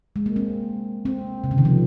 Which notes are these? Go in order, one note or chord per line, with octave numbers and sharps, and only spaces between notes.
G#3
A#3
C4
C4
C3
C#3
D#3
F3